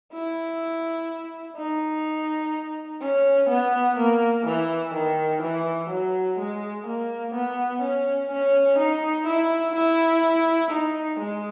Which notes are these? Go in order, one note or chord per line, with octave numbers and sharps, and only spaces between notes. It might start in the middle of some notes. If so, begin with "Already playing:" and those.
E4
D#4
C#4
B3
A#3
E3
D#3
E3
F#3
G#3
A#3
B3
C#4
C#4
D#4
E4
E4
D#4
G#3